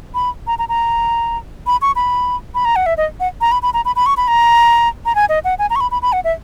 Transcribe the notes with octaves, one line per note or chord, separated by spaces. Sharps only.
B5
A#5
A#5
A#5
B5
C#6
B5
B5
A#5
F#5
E5
D#5
F#5
A#5
B5
B5
A#5
B5
B5
C#6
B5
A#5
A#5
G#5
D#5
F#5
G#5
A#5
C#6
B5
B5
B5
F#5
E5